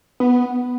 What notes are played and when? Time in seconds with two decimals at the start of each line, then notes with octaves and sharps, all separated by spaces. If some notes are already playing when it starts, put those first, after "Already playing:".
0.20 B3